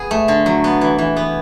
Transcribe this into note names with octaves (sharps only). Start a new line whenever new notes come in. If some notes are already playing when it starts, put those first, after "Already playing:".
Already playing: B3 G#4
A3
D3
F#3
B3
E3
E3
B3